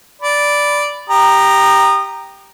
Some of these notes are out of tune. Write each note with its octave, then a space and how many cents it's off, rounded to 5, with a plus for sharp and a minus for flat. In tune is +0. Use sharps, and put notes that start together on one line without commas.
D5 -5 B5 +0
G4 +0 A#5 +0 D#6 -30